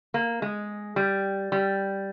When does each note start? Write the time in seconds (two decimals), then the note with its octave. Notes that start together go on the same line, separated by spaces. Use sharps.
0.14 A#3
0.42 G#3
0.96 G3
1.52 G3